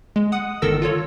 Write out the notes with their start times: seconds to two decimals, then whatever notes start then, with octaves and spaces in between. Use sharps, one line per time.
0.16 G#3
0.32 F#5 D#6
0.62 G1 D#3 A4 A#4 E6 A#6
0.82 F4 A4 C#5